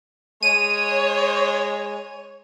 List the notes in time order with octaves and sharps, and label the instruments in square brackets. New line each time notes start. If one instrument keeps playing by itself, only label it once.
[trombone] G#3 [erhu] C#5 [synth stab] D#7